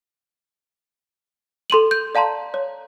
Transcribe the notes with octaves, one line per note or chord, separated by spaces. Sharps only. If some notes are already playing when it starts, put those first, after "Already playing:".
A4 C6 D#7 F#7
G6
D5 F5 A5 A#5 C6
C#5